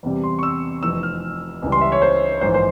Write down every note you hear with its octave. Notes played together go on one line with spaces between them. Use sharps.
E2 C3 G3
C6
C#6
E6
F1 F2 E3 E6
F6
C#2 C#3 E3 G3
C6
E5
C#5
C5
A#1 G#2 E3 C5
C5